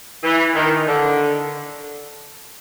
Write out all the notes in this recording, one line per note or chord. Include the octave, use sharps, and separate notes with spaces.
E3
D#3
D3